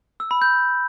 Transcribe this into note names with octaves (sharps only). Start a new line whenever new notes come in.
E6
B5
G6